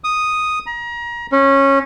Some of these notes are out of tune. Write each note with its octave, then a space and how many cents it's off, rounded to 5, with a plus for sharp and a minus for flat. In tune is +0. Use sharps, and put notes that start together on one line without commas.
D#6 +0
A#5 +30
C#4 -15